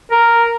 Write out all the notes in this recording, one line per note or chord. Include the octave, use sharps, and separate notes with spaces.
A#4